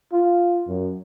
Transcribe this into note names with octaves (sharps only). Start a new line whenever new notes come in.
F4
F#2